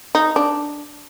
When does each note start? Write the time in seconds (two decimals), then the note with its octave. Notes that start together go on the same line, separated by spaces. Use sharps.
0.15 D#4
0.36 D4